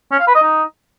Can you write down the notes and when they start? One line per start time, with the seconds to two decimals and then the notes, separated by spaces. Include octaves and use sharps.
0.12 C#4
0.20 F5
0.27 B4
0.35 D#5
0.43 D#4